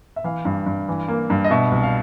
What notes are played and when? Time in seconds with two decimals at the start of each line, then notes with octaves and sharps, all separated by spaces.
0.16 E5
0.24 E3 F5
0.45 G2
0.66 G2
0.88 E3
1.08 A#3
1.30 G2
1.44 D#5
1.51 B2 E5
1.72 C2
1.83 F5